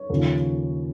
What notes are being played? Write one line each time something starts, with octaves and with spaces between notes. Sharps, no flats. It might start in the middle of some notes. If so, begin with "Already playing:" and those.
Already playing: C#5
D#2 C#3 F3